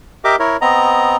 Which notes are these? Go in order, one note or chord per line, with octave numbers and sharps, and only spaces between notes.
G4 A#4 D#5 E5 D6
E4 A#4 C#5
B3 C4 D#5 A#5